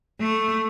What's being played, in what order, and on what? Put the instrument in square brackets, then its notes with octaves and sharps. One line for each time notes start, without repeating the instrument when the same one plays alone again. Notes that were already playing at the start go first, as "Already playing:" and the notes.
[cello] A3